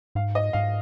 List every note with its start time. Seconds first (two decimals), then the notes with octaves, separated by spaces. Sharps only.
0.15 G#2 F5
0.35 D#5
0.53 G#2 F5